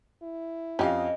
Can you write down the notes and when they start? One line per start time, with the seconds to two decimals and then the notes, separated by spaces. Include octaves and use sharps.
0.22 E4
0.79 F2 C#4 G4 D#5 F5